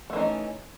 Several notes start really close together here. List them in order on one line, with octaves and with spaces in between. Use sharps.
A3 E3 D#4 C#4